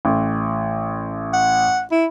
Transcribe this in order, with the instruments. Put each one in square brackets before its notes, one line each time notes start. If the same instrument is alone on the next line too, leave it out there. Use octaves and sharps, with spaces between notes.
[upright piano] A1
[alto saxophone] F#5
E4